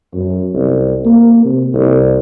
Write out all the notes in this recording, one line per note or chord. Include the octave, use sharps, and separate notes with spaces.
F#2
C2
A#3
C3
C2